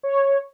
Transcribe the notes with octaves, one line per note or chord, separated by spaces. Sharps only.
C#5